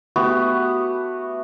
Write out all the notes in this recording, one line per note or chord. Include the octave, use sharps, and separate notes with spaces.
A3 B3 F#4 G4